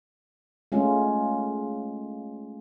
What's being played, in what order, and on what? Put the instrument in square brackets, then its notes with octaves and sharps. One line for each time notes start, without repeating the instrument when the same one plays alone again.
[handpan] G#3 A3 C#4 F4